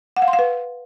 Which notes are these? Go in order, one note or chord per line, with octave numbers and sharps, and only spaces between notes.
F#5
F5
C6
F5
B4